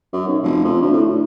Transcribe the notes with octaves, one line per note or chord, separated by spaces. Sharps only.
F#2
B1
F1
F2
D2
A2
D2